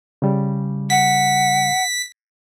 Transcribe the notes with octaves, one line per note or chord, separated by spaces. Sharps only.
C#3 G3
F#5 B6